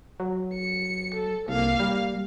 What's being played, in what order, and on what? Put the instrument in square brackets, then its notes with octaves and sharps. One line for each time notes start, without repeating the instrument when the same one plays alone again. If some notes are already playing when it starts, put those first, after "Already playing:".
[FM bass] F#3
[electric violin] C#7
A4
[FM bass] C2 [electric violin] A#3 F5
[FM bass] G3